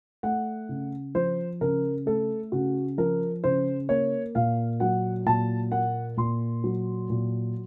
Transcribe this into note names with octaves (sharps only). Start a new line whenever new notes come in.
A3 F#5
C#3
F3 C5
C#3 A#4
A3 A4
C#3 F#4
F3 A#4
C#3 C5
A#3 C#5
A#2 F5
F#3 F#5
A#2 A5
A#3 F#5
A#2 C6
F#3
A#2